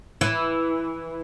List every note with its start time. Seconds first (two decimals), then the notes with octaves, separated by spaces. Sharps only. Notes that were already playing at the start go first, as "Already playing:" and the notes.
0.21 E3